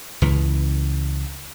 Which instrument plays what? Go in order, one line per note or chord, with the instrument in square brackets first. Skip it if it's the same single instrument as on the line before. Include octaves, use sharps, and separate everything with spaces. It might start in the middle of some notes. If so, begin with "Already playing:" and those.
[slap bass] C#2 E3